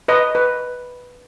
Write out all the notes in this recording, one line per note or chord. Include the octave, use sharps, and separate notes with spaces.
B4 D#5
B4